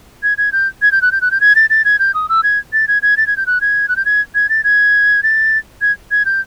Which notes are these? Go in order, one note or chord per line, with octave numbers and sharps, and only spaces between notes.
G#6
G#6
G6
G#6
G6
F#6
G6
F#6
G6
G#6
A6
A6
G#6
G6
D#6
E6
G#6
A6
G#6
G#6
A6
G#6
G6
F#6
G#6
F#6
G6
G#6
G#6
A6
G#6
A6
G#6
G#6
G6